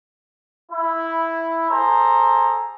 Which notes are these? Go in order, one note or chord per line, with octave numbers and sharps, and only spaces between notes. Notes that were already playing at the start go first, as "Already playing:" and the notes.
E4
G#4 A4 C5 A#5